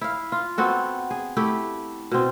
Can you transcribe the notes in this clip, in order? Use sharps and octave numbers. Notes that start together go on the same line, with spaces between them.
E4 F5
F4
B3 C4 F#4 A4
G#4
A3 E4 G4
B2 C4